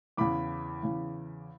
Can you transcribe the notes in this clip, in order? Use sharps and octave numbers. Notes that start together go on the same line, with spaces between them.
E2 C#3 E3 B5 D6
E2 C#3 E3